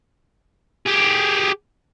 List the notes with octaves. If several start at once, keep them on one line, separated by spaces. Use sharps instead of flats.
G4 G#4